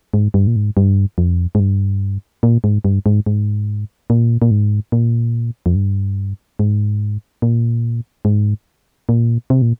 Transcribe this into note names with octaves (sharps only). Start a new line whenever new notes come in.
G#2
G2
A#2
G#2
G2
F2
G#2
G2
A#2
G#2
G2
G#2
G#2
A#2
A#2
G#2
A#2
F2
G2
G#2
A#2
G#2
A#2
C3
A#2